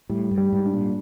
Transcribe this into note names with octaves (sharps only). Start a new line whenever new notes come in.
A2 G3
G2
G3
G#2
D4
A#2